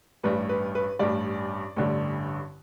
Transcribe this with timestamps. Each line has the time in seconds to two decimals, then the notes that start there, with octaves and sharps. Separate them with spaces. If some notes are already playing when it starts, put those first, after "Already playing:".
0.23 A1 G2 G3 B4
0.49 B4
0.75 B4
0.99 A1 G2 G3 D5
1.76 A1 G2 D3 G3